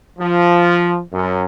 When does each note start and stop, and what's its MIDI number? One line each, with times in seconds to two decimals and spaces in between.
0.19 1.01 53
1.13 1.45 42